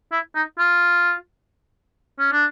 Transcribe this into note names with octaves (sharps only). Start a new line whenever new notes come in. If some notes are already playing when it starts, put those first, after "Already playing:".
E4
D#4
F4
C#4
D4